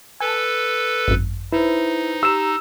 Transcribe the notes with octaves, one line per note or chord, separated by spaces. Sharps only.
A4 B4 G#5 A5
G#1 F#2
D#4 E4 B4 C5
G4 A#5 E6 E7